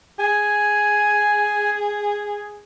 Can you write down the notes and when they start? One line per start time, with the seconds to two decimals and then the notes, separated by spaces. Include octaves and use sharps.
0.19 G#4 G#5